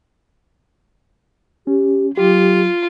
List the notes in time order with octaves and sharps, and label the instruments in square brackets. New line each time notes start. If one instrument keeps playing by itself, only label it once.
[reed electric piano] C#4 [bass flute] G4
[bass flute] F#3 [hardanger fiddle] F4 [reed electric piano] G4